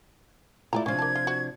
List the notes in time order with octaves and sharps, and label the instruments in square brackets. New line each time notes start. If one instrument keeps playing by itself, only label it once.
[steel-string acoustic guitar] A3 E4 F4 [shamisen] D5 G#5 A#5
[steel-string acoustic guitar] C3 F3 D4 [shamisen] C#4 F4 [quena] G#6
[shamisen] A#3 A5
F4
F#4